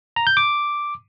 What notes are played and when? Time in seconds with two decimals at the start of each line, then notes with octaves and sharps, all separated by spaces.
0.16 A#5
0.27 G6
0.37 D6